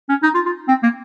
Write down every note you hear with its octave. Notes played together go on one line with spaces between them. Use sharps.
C#4
D#4
F4
F4
C4
A#3